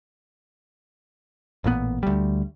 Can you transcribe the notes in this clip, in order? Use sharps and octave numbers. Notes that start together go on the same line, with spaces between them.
A1 A#2 C#3 B3
D2 G3